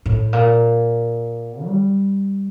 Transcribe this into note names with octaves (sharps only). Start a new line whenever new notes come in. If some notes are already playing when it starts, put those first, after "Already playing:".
A2
A#2
G3